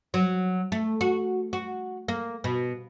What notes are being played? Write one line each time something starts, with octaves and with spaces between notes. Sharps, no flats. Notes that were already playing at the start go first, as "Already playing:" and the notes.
F#3
A3
F#4
F#4
A#3
B2